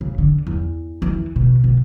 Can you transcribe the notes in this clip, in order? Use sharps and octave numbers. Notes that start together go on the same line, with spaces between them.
C#3
D3
E2
E3
B2
B2